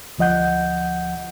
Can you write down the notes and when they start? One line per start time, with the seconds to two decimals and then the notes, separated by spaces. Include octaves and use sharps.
0.18 D2 F3 D#5 F#5 G6